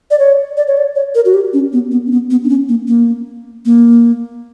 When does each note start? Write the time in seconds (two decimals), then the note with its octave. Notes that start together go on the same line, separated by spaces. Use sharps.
0.11 D5
0.19 C#5
0.57 D5
0.67 C#5
0.77 D5
0.96 C#5
1.15 A#4
1.25 F#4
1.34 G4
1.53 C#4
1.73 B3
1.91 B3
2.06 C#4
2.12 B3
2.31 B3
2.44 D4
2.49 C#4
2.69 A#3
2.88 A#3
3.65 A#3